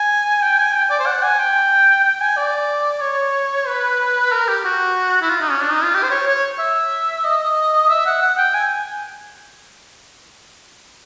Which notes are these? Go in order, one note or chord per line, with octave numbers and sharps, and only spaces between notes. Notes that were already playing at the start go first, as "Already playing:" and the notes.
Already playing: G#5
G5
G#5
G5
D5
C5
F#5
G#5
G5
G5
G#5
D5
C#5
B4
A#4
G4
F#4
E4
F4
D#4
C#4
D4
D#4
F4
G4
C5
C#5
C#5
E5
D#5
E5
F#5
F#5
G5
G#5